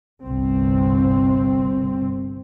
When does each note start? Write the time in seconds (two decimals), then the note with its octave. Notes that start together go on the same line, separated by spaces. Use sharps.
0.23 G1 C2 C4